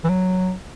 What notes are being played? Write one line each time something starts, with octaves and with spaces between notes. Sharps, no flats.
E3
F#3